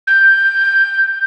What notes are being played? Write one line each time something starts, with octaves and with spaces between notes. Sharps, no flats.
G6